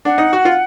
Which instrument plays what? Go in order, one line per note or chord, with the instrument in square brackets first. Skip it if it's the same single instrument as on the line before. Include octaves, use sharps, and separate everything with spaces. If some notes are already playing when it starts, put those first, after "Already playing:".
[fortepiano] D4 [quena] F#5
[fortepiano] D#4
F#4
F4